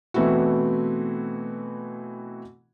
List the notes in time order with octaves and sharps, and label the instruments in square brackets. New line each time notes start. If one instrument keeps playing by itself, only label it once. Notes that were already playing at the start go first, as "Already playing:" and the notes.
[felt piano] B2 E3 A3 C4 E4 F#4